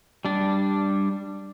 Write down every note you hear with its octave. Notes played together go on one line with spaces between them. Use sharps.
G3 D4